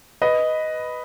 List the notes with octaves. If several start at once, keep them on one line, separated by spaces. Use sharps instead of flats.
B4 D#5